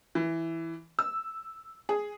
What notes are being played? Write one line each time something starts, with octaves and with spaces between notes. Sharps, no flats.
E3
E6
G#4